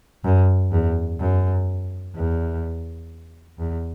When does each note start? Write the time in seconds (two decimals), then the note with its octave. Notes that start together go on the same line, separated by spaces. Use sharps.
0.24 F#2
0.72 E2
1.19 F#2
2.15 E2
3.59 E2